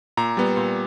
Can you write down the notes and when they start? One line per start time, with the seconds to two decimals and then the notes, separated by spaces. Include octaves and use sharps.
0.17 A#2 A#5
0.37 G3 B3
0.57 A#2